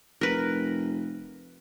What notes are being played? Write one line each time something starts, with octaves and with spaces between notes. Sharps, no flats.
F1 A#4 B4